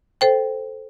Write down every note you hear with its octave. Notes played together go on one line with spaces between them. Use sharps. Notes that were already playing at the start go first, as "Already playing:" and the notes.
A4 C5 G5